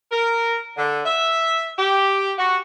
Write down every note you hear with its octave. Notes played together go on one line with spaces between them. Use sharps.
A#4
D3
E5
G4
F#4